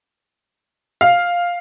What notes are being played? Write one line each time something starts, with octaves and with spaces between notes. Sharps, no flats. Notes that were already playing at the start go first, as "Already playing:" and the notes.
F5